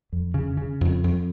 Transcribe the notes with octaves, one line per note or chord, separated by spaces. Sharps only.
F2
C#3
C#3
F2
F2